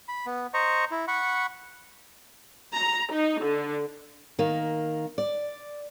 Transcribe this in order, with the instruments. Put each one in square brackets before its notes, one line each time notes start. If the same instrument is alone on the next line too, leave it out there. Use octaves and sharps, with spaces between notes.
[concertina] B5
B3
C5 D#5 A#5 C#6
E4
F#5 B5 C#6
[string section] A#5
D#4
D3
[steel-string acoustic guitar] D#3 A#3
D5